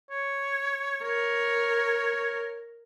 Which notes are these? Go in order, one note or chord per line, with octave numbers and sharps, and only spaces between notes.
C#5
A#4 C#5